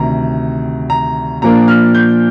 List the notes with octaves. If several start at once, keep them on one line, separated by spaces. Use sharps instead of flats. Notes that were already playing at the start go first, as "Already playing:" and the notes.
Already playing: D2 C3 D#3 A#5
A#5
A#2 F3 A#3 D4 A#5
F6
G6